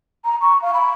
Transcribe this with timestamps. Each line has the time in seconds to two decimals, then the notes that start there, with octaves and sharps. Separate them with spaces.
0.25 A#5
0.41 C#6
0.62 F5
0.74 B5